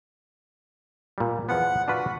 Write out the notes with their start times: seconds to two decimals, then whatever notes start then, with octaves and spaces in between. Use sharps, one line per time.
1.18 A#2 G3
1.49 E2 F3 B3 F#5
1.88 D4 F4 F#4 B4